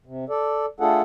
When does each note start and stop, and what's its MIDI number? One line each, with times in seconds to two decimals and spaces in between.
0.06 0.25 48
0.29 0.66 69
0.29 0.66 74
0.80 1.02 57
0.80 1.02 62
0.80 1.02 65
0.80 1.02 68
0.80 1.02 69
0.80 1.02 78